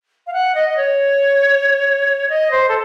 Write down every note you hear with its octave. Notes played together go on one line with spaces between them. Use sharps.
F5
F#5
D#5
D#5
C#5
D#5
C5
A4